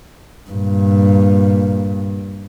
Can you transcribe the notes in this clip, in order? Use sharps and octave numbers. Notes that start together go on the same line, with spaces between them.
G2 A#2